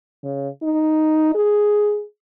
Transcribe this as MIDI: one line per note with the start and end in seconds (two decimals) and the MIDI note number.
0.24 0.48 49
0.63 1.34 63
1.35 2.03 68